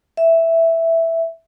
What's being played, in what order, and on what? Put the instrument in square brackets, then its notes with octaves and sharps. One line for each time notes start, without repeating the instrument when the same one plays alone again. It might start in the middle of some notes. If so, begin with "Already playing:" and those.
[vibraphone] E5